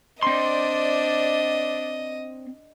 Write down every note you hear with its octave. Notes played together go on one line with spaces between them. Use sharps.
C4 D4 C5 D5 D#5 C6